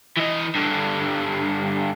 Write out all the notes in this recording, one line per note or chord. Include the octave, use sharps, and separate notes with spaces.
E3 D#5
G2 D3